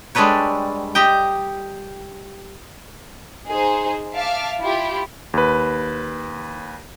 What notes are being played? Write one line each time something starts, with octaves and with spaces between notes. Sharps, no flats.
G3 G#3 D4 A4 B4 C#5
G4 D#5 G5
D#4 G#4 C5
E5 F5 A5 D6 F6
E4 F4 G4
D#2 B4